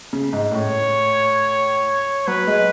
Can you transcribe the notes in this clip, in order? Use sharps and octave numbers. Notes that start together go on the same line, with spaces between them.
C#3
G#2
A2 C#5
F#3 B4
G#3